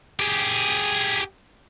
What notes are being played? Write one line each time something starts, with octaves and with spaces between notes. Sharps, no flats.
G4 G#4